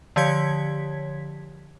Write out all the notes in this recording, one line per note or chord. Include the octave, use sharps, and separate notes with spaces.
D3 F3 G4 C#5 G#6 B6